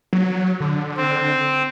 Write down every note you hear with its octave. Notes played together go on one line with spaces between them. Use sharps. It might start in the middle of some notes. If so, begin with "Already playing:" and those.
F#3
D3
C4